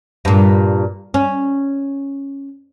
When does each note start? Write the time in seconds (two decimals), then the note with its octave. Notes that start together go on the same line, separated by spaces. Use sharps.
0.25 G2 A#2
1.14 C#4